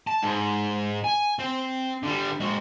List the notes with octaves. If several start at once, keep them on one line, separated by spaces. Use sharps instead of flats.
A5
G#2
G#5
C4
D3 G3
G#3 F#4